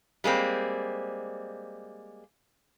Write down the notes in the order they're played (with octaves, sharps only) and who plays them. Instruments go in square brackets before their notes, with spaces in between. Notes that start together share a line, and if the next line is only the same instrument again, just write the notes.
[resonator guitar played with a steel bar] G3 G#3 A#3 C4